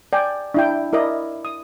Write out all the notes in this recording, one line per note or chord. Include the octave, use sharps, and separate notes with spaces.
D5 G5 G#5
D4 E4 G5
E4 A#4 D5 D#5
D#6